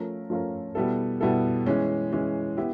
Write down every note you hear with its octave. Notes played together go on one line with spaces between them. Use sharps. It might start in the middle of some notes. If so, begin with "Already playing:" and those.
Already playing: F3 A3 C#4 F4 A#4
F3 A3 C#4 F4 A#4
B2 G3 B3 E4 A4
B2 G3 B3 E4 A4
E3 G#3 C#4
E3 G#3 C#4
B3 E4 G4